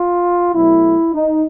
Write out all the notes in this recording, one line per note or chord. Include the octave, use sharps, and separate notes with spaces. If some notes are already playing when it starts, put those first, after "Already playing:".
Already playing: F4
B2 F#3 A3 E4
D#4